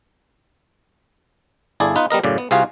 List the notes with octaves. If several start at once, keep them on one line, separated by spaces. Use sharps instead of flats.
G1 E4 G#4 A4 D5
B3 D#4 F4 B4
G3 B3 A#4 D#5
F#2 A2 C#3 D5
B3
C2 C3 F4 F#4 G#4 F5